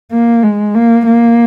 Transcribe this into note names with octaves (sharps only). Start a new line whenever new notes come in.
A#3
G#3
A#3
A#3